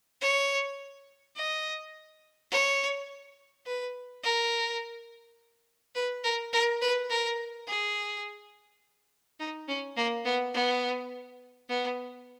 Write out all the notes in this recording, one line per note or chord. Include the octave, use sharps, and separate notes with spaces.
C#5
D#5
C#5
B4
A#4
B4
A#4
A#4
B4
A#4
G#4
D#4
C#4
A#3
B3
B3
B3